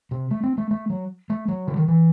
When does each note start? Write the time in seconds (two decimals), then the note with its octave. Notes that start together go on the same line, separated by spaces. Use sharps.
0.11 C3
0.31 A3
0.43 C4
0.58 A3
0.71 A3
0.90 F#3
1.30 A3
1.48 F#3
1.67 C#3
1.77 D#3
1.88 E3